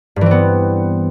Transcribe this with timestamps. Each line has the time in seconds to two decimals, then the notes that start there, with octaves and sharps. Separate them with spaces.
0.16 G2
0.21 E3
0.26 C4
0.31 B3